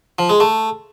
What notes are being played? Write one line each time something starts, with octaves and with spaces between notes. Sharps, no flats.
F3
G#3
A3